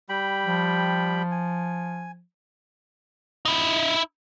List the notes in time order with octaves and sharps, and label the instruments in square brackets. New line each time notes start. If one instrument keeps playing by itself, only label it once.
[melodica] G3 G5 B5
[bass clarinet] F3
[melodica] G#5
[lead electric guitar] D#4 E4